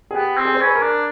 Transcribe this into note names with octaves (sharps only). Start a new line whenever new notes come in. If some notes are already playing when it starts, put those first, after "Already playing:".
G#4
B3 G4
C4 G4
G#4
C5
C#4 B4
A#4
D4